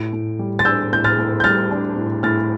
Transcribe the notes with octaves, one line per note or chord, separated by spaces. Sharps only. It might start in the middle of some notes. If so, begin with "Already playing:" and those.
Already playing: A2 D7
A2
G3
A6
D4 E6 G6
A2 G6
F6 A6
A2
G6
G3 F6 A6
D4
A2
A2 F6 A6